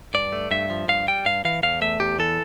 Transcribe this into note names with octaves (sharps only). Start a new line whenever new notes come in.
G2 D5
A3
G2 E5
F3
G2 F5
G3 G5
G2 F5
E3 F5
E2 F5
A3 E5
E2 G4
E3 A4